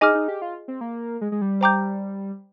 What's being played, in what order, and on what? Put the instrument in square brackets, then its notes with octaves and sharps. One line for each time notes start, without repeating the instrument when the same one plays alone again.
[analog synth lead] D#4 [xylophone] G#4 D#5 G#5 D6 F6
[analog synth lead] D#4
G4
F4
C4
A#3
G#3
G#3
G3
[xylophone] C5 G5 A#5 D6 G6